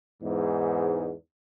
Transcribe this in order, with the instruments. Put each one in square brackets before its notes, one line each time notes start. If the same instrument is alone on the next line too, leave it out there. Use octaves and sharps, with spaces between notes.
[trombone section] E2 G#2